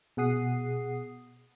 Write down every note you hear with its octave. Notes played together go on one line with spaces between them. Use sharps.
B2 G#4 F#5 D#6 C7